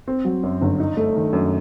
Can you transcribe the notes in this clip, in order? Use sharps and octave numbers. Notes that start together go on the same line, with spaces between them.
C4
F#3
F#2
G1
D#4
A3
D#3
F#2